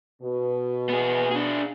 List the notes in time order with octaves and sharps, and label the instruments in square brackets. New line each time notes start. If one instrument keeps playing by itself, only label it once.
[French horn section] B2
[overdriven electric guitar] B3 G#4
D4 G#4